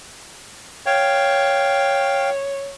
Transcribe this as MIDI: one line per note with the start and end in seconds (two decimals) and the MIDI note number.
0.86 2.72 73
0.86 2.30 77
0.86 2.30 79